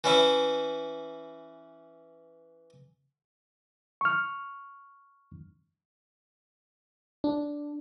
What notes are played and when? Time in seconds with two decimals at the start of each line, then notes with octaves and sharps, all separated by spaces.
0.04 E3 C#4 E4
4.01 C#6 F6
7.24 D4